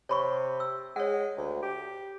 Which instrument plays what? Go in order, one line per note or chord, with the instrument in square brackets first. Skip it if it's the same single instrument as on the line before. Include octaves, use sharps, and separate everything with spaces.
[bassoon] C3 [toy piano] C#5 B5 C#6
[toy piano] E6
[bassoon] G#3 [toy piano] C#5 F#5
[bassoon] D2
G4